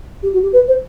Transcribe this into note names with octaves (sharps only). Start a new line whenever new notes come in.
G4
F#4
G4
B4
C5